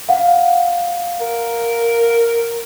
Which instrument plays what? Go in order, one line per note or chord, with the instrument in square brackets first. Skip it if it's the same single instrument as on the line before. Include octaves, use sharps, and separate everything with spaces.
[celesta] F5 F#5
[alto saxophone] A#4